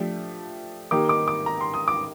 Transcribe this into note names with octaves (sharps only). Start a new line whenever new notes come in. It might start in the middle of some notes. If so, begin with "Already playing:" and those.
Already playing: F3 A3 D4 G4
D#3 A#3 D#4 G4 D6
D6
D6
A#5
C6
D#6
D6